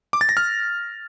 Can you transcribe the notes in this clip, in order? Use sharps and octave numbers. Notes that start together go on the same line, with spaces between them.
D6
A6
A#6
F6